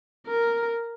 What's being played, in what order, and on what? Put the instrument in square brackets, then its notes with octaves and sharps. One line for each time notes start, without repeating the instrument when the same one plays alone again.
[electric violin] A#4